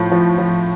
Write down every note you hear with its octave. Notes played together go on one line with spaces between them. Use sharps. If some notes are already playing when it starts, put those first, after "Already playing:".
Already playing: A2 F3
F3
F3